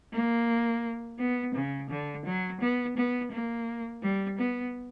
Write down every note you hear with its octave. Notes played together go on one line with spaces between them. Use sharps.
A#3
B3
C#3
D3
F#3
B3
B3
A#3
G3
B3